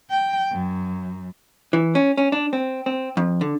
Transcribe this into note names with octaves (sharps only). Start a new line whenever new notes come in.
G5
F#2
E3
C#4
C#4
D4
C4
C4
F2
D3